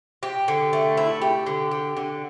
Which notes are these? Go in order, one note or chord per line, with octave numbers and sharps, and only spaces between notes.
G4
D3
A3
E4
G4
D3
G4
D3